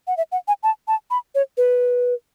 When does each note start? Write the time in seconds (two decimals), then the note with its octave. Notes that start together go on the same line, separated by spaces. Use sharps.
0.07 F#5
0.17 E5
0.32 F#5
0.48 G#5
0.63 A5
0.88 A5
1.11 B5
1.35 C#5
1.57 B4